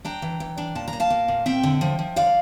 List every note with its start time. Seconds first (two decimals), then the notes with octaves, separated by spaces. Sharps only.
0.04 D4 G5 A#5
0.22 E3
0.40 E3
0.58 D4
0.75 A#2 A5
0.88 A#5
0.93 A#2
1.00 F5 A5
1.10 A#3
1.28 A#2
1.46 C4 E5 G5
1.63 D3
1.81 F3
1.99 F3
2.16 D3 D5 F5